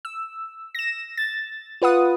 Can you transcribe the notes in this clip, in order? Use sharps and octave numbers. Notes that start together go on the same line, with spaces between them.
E6
A#6 E7
A6
F4 B4 F#5 D#6